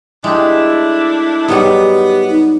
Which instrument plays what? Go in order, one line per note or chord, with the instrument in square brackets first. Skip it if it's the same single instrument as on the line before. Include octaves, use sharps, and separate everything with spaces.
[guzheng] G#3 G4 [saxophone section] A3 D4 E4
[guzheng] G#2 F#3 G3 [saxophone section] B3 [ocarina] G4
[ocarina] D#4